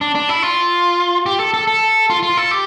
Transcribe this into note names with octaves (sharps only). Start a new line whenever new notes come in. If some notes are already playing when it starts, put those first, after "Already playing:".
D4
D4
E4
F4
G4
A4
A4
A4
F4
F4
A4
G4